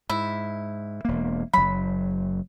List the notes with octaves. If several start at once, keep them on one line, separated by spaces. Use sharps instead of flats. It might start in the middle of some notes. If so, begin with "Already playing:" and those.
G#2 E4
E1 A#3
F#1 F#3 B5